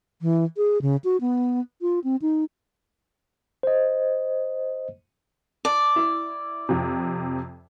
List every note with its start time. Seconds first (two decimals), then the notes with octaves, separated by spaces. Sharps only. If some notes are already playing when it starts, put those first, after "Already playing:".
0.22 E3
0.57 G#4
0.82 C#3
1.04 F#4
1.21 B3
1.82 F4
2.04 C4
2.22 D#4
3.63 C5 D#5
5.65 D5 A5
5.96 E4
6.69 F2 C3